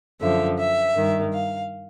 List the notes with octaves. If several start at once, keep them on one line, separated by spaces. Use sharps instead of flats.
F#2 D3 F3 E5
E5
G2 D#3
F5